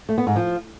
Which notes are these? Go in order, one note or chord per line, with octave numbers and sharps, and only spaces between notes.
A3
B3
G#2
F3